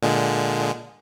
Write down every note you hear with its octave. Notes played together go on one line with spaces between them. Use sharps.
A#2 D3 G#3